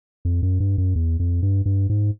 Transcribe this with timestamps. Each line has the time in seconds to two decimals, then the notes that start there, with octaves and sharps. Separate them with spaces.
0.25 F2
0.43 F#2
0.60 G2
0.78 F#2
0.96 E2
1.20 F2
1.43 G2
1.66 G2
1.90 G#2